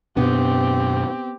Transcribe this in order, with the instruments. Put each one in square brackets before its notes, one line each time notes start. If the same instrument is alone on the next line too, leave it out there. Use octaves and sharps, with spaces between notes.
[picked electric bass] F#2 B2 D4 [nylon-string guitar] B3 [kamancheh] C4 G4